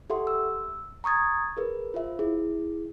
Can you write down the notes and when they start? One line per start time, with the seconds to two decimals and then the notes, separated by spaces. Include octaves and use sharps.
0.10 G4 A4 E5 F#5 C6
0.27 E6
1.04 A#5 C#6 D#6 G#6 A6
1.57 G#4 A#4 B4
1.94 F4 C5 E5
2.19 E4 G#4